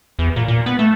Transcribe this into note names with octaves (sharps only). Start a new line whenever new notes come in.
E2
A#2
A#2
B3
A3